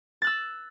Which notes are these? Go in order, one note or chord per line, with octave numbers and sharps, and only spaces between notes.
E6 F#6 A6